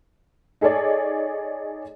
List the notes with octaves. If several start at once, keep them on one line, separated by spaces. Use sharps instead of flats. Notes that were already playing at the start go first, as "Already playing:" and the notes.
D#4 G#4 A4 C#5 D5